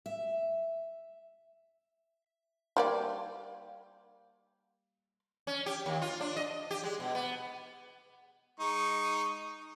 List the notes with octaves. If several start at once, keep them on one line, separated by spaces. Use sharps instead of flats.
E5
G3 A#3 D5
C#4
G4
D#2
F4
D4
D#5
G4
G#3
B2
B3
G#3 D#4 C#6